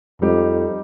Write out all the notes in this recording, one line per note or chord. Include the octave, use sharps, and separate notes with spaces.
F2 G3 D#4 G4